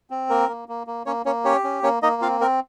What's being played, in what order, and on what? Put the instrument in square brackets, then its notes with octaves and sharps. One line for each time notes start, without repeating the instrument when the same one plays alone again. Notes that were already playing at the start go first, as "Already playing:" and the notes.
[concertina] C4
A#3 A#4
A#3
A#3
A#3
A#3 C#4 C#5
A#3 C#4 C#5
C#4 G4 C#5
C#4
A#3 C#4 C#5
A#3 D#4 D#5
C4 F4 F5
C4 A#4